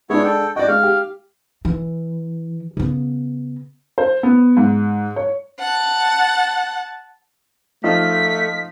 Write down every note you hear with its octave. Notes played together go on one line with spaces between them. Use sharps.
G#3 B3 D4 E4 C#5
A4 G5
F#4 D5 D#5 G5
G#3 F5
G4
E3
C#3 B3
C5
B3
G#2
C#5
F#5 A5
F3 A3 D#4 F4 B6